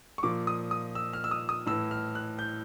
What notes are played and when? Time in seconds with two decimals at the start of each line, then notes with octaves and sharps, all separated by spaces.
0.18 C#6
0.23 A#2 F3 D6
0.47 D#6
0.71 D#6
0.95 E6
1.13 F6
1.24 E6
1.31 D#6
1.49 D#6
1.66 A2 E3 E6
1.91 F6
2.15 F#6
2.39 G6